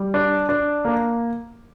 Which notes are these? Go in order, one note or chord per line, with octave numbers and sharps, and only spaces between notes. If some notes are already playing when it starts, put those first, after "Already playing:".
Already playing: G3
D4
D4
A#3